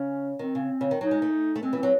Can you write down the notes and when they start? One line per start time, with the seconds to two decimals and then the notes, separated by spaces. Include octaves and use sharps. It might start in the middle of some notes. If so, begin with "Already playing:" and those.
Already playing: C#3 C#4
0.39 D#3 C4
0.55 C#3
0.81 C#3
0.91 D#3
1.01 F#3 D#4
1.11 G#3
1.22 A3
1.56 A3
1.63 G#3 C4
1.73 E3
1.78 C4
1.83 F#3